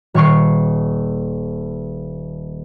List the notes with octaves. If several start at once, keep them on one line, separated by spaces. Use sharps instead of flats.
D#1 C#5 C#6 C7